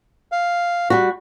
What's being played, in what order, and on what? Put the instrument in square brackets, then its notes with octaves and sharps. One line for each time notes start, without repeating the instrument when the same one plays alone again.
[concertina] F5
[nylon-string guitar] G3 F#4